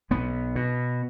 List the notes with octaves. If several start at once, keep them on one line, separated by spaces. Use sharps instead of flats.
B1 B3
B2